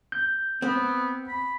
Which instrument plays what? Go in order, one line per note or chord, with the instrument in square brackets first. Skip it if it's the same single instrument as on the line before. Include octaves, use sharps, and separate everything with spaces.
[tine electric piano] G6
[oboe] B3 [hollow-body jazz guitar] C4
[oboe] B5